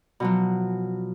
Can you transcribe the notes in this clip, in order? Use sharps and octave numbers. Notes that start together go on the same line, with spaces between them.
B2 F3 F#3